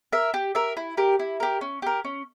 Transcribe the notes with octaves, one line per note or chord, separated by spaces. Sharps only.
A#4 E5
G4
A#4 E5
E4
G4 A#4
E4
G4 A#4
C#4
G4 A#4
C#4